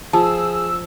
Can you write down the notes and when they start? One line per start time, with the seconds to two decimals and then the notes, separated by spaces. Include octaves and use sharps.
0.13 F3 G#4 A5 E6